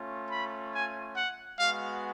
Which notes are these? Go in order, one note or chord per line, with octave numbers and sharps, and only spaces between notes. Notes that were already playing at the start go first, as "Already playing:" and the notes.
Already playing: A3 C#4 F4
B5
G#5
F#5
G#3 B3 F#4 F5